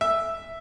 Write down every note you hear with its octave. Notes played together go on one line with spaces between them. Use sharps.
E5